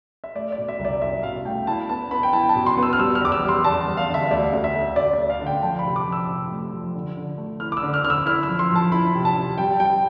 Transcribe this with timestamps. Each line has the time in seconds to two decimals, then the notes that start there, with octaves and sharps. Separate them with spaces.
0.24 E5
0.35 A3 D5
0.52 D5
0.58 B2
0.68 E5
0.79 C2
0.85 D5
1.02 C2 E5
1.23 B2 F5
1.45 A3 G5
1.67 E4 A5
1.89 B3 A5
2.11 B3 B5
2.23 G5
2.33 E4 A5
2.49 A5
2.55 B2
2.66 C6
2.77 B3
2.83 E6
2.93 F6
2.99 G3 E6
3.15 F6
3.22 E2 D6
3.32 E6
3.43 G3
3.49 C6
3.64 E2 A5
3.87 G3
3.97 F5
4.09 D3
4.14 E5
4.31 D2 D5
4.53 D2
4.64 E5
4.75 D2
4.96 D2 D5
5.13 D2 D5
5.30 F5
5.41 D3
5.47 G5
5.62 F3 A5
5.79 B5
5.85 C3
5.96 D6
6.07 F3
6.12 E6
6.28 C3
6.51 A3
6.72 F3
6.95 D3
7.16 D3
7.38 A3
7.60 E4 F6
7.72 D6
7.77 E6
7.83 D3
7.94 F6
8.04 D3 F6
8.10 E6
8.26 E4 F6
8.43 E6
8.49 F3
8.59 C6
8.71 F3 A5
8.92 E4 B5
9.14 C3
9.25 A5
9.36 C3
9.57 G3 G5
9.80 G3 G5